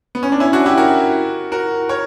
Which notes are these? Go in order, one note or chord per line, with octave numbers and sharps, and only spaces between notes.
B3
C#4
D4
C#4 E4
D4 F#4
E4 G4
F#4 A#4
F#4 A#4
A#4 C#5